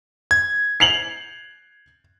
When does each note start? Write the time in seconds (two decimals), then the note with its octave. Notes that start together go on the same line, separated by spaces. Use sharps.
0.31 G#6
0.80 C7 F7 F#7